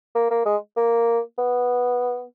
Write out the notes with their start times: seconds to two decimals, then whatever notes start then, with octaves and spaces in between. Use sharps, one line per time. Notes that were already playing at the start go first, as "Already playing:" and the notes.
0.15 A#3
0.30 A#3
0.46 G#3
0.76 A#3
1.38 B3